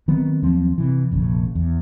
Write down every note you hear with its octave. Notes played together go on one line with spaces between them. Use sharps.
D#3 F#3 B3 C4
D#2 F3 F#3 C4
C3 E3
F1 A#1 A2 C#3
E2